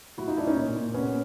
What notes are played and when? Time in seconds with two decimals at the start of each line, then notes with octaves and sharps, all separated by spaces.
0.18 A2 E4 F#4
0.27 D#4 F4
0.37 A2 D4 E4
0.46 C#4 D#4
0.56 A#2
0.76 A#2
0.94 C3 B3 C#4